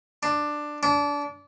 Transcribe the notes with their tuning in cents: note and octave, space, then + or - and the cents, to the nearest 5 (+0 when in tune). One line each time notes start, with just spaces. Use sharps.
D4 +10
D4 -25